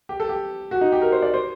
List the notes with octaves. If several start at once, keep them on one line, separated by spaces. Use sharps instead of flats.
G4
A4
G4
F#4
D#4
G4
A#4
C5
D5
C5